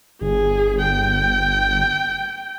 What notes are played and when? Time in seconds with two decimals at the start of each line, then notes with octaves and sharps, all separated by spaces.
0.21 G1 G#4
0.82 G5